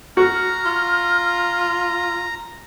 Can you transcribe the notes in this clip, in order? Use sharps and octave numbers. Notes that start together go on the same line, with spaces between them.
F#4 A#5 F6
F4